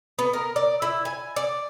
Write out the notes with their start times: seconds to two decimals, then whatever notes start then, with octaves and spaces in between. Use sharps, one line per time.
0.19 B3
0.33 A#4
0.56 D5
0.82 E4
1.05 G#5
1.36 D5